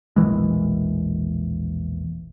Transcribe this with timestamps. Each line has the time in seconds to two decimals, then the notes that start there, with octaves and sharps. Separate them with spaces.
0.16 E1 A#1 E3 G#3